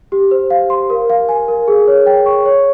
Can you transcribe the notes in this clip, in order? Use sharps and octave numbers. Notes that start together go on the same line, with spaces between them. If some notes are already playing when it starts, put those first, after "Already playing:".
G4
C5
F5
C6
A#4
F5
G#5
A#4
G#4
C#5
G5
C#6
C#5